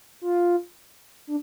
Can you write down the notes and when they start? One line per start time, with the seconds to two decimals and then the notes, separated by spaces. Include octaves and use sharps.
0.21 F4
1.27 D4